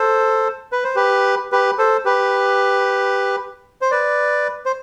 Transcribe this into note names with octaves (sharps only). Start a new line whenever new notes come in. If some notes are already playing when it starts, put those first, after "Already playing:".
Already playing: A4 C5
B4
C5
G4 B4
G4 B4
A4 C5
G4 B4
C5
B4 D5
C5